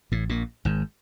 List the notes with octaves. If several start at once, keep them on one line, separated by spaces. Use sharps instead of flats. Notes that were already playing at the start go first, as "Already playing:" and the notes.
A1 A2
A#1 A#2
G#1 G#2